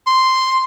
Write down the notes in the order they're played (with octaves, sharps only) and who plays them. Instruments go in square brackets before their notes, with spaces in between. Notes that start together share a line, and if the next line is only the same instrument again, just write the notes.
[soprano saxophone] C6